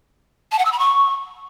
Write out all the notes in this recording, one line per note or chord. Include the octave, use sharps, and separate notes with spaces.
A5
F#5
E6
B5
C#6